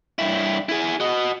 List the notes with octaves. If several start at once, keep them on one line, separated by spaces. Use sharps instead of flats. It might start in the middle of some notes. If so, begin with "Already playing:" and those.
G2 E4
E4 G#4
F#4 D#5